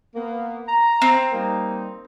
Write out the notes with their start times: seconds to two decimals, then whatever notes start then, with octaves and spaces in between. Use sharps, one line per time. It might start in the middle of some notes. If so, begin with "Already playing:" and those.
0.15 A#3 B3
0.68 A#5
1.02 C4
1.32 G3 A#3 D#4